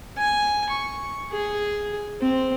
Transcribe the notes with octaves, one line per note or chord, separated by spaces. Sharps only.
G#5
C#6
G#4
C4